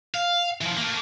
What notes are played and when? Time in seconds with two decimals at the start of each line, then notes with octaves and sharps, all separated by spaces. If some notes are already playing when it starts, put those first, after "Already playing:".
0.14 F5
0.61 E3 F3
0.77 A3 A#3